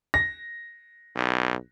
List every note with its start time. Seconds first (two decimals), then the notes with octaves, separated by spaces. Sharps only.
0.14 A#6
1.16 B1